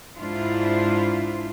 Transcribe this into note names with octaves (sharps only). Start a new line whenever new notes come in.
G#2 D4 E4 F4 C5